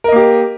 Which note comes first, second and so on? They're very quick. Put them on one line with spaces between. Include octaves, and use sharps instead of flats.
A#4 D#5 A#3 G4